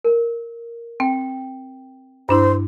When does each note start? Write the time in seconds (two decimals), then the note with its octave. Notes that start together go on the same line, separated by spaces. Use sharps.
0.04 A#4
1.00 C4 G5
2.29 G2 D4 E4 F#4 C5